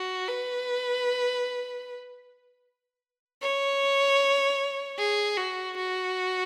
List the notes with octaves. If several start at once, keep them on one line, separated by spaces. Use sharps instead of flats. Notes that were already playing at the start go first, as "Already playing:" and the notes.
Already playing: F#4
B4
C#5
G#4
F#4
F#4